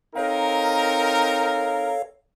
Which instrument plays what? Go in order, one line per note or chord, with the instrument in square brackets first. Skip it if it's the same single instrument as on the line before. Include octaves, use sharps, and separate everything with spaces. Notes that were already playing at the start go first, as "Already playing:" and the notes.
[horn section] C4 D#4 A#4 [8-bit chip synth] A4 C#5 F5